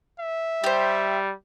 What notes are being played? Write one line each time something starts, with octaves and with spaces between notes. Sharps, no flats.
E5
G3 G4 C5